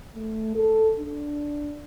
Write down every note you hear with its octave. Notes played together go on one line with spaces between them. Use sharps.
A3
A4
D4